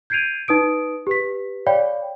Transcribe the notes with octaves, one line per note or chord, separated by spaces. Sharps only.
G6 G#6 C7 D7 D#7 F7
D#4 B4 D#6 D7
G4 B4 B6
C#5 D5 F5 G5 B5